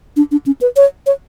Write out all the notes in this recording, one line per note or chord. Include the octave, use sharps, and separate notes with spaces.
D4
D4
C#4
B4
C#5
C#5